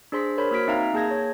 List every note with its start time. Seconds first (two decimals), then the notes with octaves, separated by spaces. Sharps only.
0.12 D4 G#4 C5 C6 B6
0.38 A#4 C5 C#5 B5
0.51 A#3 F#4 F6 G#6 B6 D7
0.67 C4 D#4 E5 F5 A#5
0.94 A#3 G#4 A5 G6 G#6 A#6
1.11 C#5